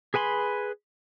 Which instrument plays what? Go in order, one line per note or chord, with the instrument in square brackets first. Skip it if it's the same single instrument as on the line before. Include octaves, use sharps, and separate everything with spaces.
[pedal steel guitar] G#4 B4 G#5 B5 C6